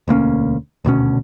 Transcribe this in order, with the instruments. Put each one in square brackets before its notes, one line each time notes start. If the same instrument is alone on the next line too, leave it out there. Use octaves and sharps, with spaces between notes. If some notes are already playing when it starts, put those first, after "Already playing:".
[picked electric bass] E1 D2 A#3 C#4
D#1 D2 B2 C#4